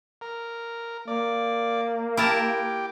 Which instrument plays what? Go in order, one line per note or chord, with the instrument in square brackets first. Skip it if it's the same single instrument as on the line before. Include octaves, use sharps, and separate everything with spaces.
[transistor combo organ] A#4
[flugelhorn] A#3 [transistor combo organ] D5
[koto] E4 A#4 A5 [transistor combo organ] G4